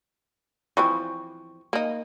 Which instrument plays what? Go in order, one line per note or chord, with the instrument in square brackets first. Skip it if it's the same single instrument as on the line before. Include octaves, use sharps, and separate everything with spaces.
[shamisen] E3 F3 C4 [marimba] C#6
[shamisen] A#3 D#4